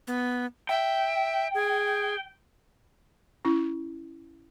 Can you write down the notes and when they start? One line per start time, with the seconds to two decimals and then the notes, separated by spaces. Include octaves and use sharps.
0.07 B3
0.69 E5 G5
1.54 G#4
3.45 C#4 E4